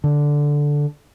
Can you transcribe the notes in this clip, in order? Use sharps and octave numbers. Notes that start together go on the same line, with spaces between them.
D3